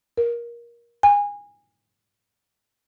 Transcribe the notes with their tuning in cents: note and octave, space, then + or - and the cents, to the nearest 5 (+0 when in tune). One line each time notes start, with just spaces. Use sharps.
A#4 +20
G#5 -25